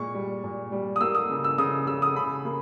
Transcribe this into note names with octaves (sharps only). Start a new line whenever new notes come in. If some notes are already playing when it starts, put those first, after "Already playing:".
Already playing: A#2 G#3 C#6
G3
A#2
G3
D#6
A#3 E6
D#6
C#3
E6
C#3 D#6
C#3 E6
D#6
C#3 B5
A#3